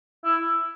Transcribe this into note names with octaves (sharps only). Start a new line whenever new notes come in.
E4